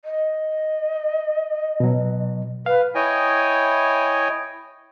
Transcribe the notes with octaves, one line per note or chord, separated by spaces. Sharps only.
D#5
B2 F#3
B4 F5
E4 C#5 D#5 G5 G#5